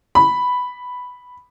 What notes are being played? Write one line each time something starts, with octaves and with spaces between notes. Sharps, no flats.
B5